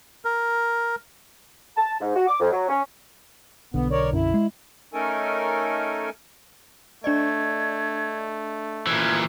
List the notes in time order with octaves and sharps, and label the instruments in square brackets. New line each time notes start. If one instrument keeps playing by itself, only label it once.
[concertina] A#4
[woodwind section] A5
G#2
F#4
D6
F2
F#3
C#4
[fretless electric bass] B1 D3 [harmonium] B3
[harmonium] A#4 C#5 D5
[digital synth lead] F#2 [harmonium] E4
[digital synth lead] G#3
[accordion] A3 C#4 D#4 A4 A#4 G#5
[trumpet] A3 [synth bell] D4 D5 D#5 [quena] G#6
[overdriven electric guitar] A#2 E3 [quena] G#6